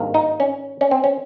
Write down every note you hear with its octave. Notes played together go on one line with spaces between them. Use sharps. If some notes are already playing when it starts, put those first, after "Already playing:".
Already playing: G#1 G2 D#3 A#3
D#4
C#4
C#4
C4
C#4